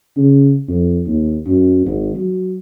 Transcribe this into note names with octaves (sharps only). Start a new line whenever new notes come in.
C#3
F2
D#2
F#2
G#1
F#3